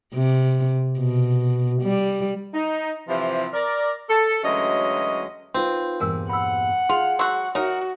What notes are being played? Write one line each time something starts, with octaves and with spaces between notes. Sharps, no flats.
C3
B2
G3
D#4
C3 E3 F3
A#4 D5
A4
D2 E3 F#3 G#3 C#4 D#5
C4 D#4 F4 B4
E2 G2 A#2 A#4 G#5 E6
F#5 B5 E6
F4 G#4
F#3 F#4 C6 C#6 E6
D#4 F#4 A#4 C#5 E5 F#5